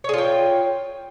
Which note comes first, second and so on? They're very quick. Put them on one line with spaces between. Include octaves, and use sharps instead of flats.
C#5 G#4 F4 G5